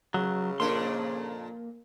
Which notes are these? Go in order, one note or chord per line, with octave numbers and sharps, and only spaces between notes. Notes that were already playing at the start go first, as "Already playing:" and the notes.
C#3 F#3
F2 A#2 A#3 D4 A#4 C6